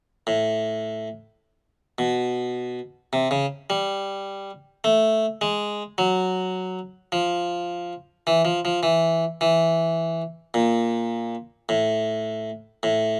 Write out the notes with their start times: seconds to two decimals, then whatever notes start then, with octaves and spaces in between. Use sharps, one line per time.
0.27 A2
1.98 B2
3.13 C3
3.31 C#3
3.70 G3
4.84 A3
5.41 G#3
5.98 F#3
7.12 F3
8.27 E3
8.45 F3
8.65 F3
8.83 E3
9.41 E3
10.54 A#2
11.69 A2
12.83 A2